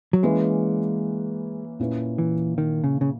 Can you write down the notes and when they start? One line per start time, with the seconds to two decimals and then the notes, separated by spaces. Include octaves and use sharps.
0.13 F#3
0.23 E3 G#3 A#3 C#4 E4 B4
1.79 A#2 A#3 C#4 E4 B4
2.18 E3
2.58 D#3
2.84 C#3
3.01 C#3